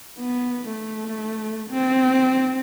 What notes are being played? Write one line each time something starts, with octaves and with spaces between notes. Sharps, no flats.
B3
A3
C4